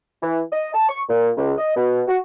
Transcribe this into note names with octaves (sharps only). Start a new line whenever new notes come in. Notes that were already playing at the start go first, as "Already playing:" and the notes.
E3
D#5
A5
C#6
A#2
C#2
D#5
B2
F#4